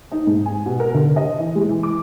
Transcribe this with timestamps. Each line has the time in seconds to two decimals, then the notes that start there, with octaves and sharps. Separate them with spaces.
0.12 D#4
0.27 G#2
0.46 G#5
0.66 B2
0.80 A#4
0.94 D3
1.16 D#5
1.39 E3
1.55 G#3
1.69 E3
1.83 D6